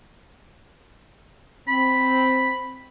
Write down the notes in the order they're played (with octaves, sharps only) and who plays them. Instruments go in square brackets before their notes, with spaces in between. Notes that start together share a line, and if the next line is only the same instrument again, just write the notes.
[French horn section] C4 [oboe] B5